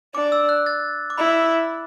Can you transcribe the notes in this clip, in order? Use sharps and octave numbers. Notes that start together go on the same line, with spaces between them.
D4 D6
E6
F#6
A6
D6
E4 B5